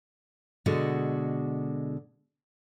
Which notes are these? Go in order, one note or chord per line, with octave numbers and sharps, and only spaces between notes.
B2 D3 G#3 F#4